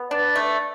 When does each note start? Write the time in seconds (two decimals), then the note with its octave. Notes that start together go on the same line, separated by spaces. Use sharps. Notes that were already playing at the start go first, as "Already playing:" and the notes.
Already playing: B3
0.11 D4 B4 D5
0.36 A3